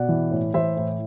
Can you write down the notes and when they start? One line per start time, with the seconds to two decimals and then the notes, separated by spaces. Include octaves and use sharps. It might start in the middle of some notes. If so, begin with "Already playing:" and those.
Already playing: B2 D5 F#5
0.09 E3
0.31 A2
0.54 E3 C5 E5
0.77 A2